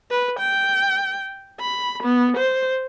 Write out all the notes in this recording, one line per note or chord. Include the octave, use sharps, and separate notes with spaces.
B4
G5
B5
B3
C5